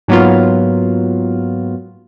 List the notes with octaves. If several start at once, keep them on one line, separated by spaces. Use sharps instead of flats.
G#2 F#3 A#3 B3 F4